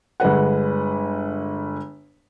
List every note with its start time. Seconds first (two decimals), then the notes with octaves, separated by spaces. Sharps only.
0.20 G1 G#3 B4 F#5